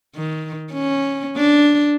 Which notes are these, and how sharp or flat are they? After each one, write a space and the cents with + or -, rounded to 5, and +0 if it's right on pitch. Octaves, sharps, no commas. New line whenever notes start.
D#3 +15
C#4 -10
D4 -5